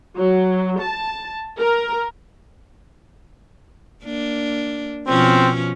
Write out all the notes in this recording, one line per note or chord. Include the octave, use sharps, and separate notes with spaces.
F#3
A5
A#4
A#3 D4
B2 F3 C4 C#4